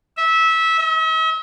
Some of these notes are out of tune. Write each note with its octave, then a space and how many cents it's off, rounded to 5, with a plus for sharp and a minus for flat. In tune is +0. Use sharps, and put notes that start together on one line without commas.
E5 -20
E5 -45